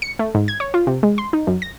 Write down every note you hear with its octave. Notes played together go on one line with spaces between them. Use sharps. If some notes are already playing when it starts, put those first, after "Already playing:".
C#7
A3
G#2
G#6
C#5
F4
C3
G#3
C6
D#4
F#2
A#6